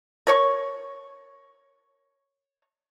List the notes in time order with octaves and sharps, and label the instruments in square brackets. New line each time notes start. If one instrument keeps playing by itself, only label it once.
[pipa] A#4 C#5 C#6